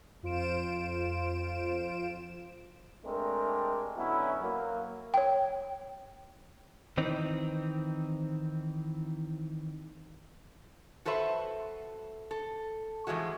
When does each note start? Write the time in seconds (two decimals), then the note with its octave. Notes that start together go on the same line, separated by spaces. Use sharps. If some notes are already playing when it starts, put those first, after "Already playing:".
0.23 F2 F4 C5 D7 E7
3.05 G#3 A3 C4 D4 G4 A#4
3.97 D3 F#3 B3 C#4 E4
4.42 F#3 A#3
5.14 C#5 G5
6.98 D#3 E3 C4 D#4
11.05 F#4 A4 B4 C5 E5
12.31 A4
13.07 A2 E3 F3 G#3 F#4